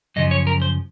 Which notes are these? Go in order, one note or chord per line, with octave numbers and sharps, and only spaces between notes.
F#2 C#3 F3 D#5
C#5
A#4
C5